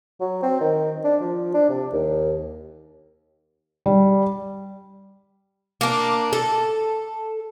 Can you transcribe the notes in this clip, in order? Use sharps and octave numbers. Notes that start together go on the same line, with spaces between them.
F#3
C4
D#3
D4
F3
D4
C3
D#2
G3
A#3 D4
A4